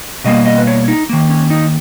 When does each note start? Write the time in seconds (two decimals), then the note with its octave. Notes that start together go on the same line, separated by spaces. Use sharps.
0.24 B2 G3 A#3 D#5
0.46 D#5
0.58 B4
0.67 C#5
0.88 D#4
1.09 D#3 A#3
1.29 C#4
1.50 D#4